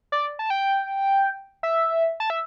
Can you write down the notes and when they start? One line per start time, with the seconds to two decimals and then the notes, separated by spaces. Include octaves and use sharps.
0.12 D5
0.39 A5
0.50 G5
1.63 E5
2.20 A5
2.30 E5